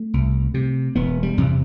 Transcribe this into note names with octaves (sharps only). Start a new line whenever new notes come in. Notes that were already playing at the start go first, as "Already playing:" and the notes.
Already playing: A3
C2
C3
E1 B3
G3
E2 C3